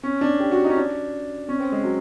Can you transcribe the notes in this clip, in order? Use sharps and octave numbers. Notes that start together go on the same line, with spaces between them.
C#4
D4
G4
F#4
D#4
C#4
D4
C#4
C4
G#3
F#3